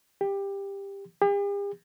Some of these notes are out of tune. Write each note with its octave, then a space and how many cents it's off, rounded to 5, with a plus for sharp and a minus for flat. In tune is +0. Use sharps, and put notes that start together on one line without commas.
G4 +15
G4 +45